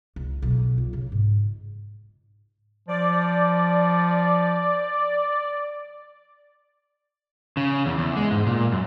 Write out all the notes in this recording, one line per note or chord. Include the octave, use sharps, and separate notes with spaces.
C#2
B1
F4
C#3
G#2
F3 D5
C#3
E2
E2
G#3
G#2
A#2
F#2